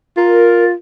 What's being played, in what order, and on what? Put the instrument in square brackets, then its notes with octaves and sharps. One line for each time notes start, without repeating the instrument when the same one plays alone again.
[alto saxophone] F4 [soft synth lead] A#4